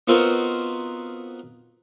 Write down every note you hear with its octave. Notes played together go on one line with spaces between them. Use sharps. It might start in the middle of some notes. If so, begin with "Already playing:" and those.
B3 C4 D#4 F4 F#4 A#4